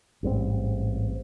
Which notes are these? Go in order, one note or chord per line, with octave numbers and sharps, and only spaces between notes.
A1 G#2 G3 C4